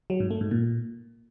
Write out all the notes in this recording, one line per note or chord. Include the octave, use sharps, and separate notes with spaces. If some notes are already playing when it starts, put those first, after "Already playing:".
F#3
G#2
A3
G#2
A#2